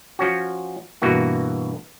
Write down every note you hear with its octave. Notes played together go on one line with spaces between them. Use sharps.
F3 C#4 F#4
G2 B2 E3 A#3 F#4